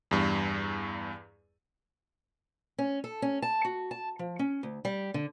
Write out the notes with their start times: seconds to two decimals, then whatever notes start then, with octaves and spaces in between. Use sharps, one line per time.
0.11 E2 G2
2.78 C#4
3.04 A4
3.22 C#4
3.42 A5
3.65 F#4
3.91 A5
4.19 F3
4.39 C#4
4.63 D2
4.85 G3
5.14 D3